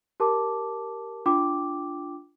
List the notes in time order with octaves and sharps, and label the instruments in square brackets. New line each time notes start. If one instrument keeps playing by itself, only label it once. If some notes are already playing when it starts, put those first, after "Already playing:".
[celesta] G4 A#4 A5 D6
D4 F4 G5 D6